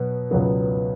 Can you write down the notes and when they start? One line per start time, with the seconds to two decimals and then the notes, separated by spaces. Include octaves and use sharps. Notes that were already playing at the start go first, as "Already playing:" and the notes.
Already playing: B2 F#3 B3
0.31 C#2 B2 F#3 B3